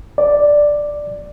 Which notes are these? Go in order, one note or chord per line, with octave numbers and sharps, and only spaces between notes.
D5